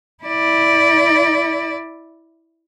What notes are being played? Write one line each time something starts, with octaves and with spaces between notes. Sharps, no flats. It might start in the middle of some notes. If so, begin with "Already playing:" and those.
E4 D5